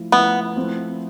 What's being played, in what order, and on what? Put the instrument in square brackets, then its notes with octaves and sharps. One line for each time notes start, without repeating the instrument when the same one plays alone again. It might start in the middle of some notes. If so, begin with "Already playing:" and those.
Already playing: [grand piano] F3 A3 E4
[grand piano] F3 A3 E4 [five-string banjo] B3
[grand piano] F3 A3 C4 E4